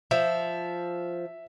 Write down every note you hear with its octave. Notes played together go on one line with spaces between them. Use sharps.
F3 E5